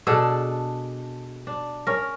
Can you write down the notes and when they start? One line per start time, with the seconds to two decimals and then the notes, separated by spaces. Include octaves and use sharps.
0.07 B2 D4 G#4 A4
1.47 D4
1.87 C#4 A#4